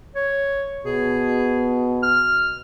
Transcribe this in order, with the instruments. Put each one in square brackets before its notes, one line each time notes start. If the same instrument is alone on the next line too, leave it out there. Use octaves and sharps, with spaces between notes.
[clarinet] C#5
[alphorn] B2 [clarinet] G#4
[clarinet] F6